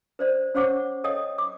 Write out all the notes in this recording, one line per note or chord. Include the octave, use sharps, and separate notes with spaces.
B4 C5 D5
C#4 C5 C#5 F#5 C#6 D6
A4 C#5 D#5 G5 D#6
D6